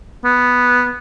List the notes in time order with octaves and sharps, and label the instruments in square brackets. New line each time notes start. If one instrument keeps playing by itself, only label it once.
[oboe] B3